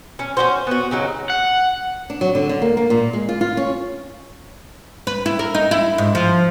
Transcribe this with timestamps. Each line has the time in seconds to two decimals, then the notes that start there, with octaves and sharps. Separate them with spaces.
0.19 C#4
0.37 C#4 D4 F#4 C5
0.67 B3 F#4
0.91 C#3 F#3 D#4
1.30 F#5
2.10 D4
2.21 F#3
2.35 D3
2.49 D3
2.62 A#3
2.77 A#3
2.90 A#2
3.13 G#3
3.29 F4
3.41 F4
3.57 C#4
5.07 B4
5.26 E4
5.39 A#4
5.55 D#4
5.71 E4
5.98 G#2
6.15 F3